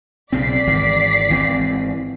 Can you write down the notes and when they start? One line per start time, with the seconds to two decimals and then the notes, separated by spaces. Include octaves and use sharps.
0.32 B1 C#3 C4 D5 B6 C7
0.67 G#1 D#3 E3
1.30 G#1 E3 C4